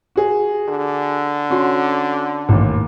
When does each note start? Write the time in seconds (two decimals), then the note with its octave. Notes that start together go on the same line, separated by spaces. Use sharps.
0.16 F#4 G#4
0.69 D3
1.50 C#4 F#4 C6
2.49 A1 D#2